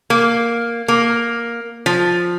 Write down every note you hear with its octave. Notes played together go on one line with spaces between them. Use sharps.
A#3
A#3
F3